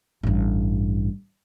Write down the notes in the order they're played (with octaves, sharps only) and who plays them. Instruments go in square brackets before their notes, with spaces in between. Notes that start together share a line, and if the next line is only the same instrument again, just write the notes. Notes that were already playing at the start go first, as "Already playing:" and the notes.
[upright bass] A1 G2